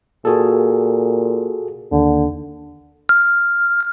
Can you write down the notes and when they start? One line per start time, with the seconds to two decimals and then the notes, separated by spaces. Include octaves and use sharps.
0.25 A#2 F#4 G#4 A4
1.92 D#2 D3
3.09 F6